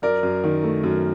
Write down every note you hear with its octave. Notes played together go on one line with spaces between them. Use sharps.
F#2 A#4 D5
F#2
D#3
A3
F#2